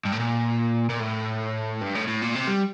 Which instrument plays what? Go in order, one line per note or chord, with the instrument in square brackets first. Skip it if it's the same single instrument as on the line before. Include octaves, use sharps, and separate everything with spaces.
[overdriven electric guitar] G2
A2
A#2
A#2
A2
G2
A2
A2
A#2
C3
G3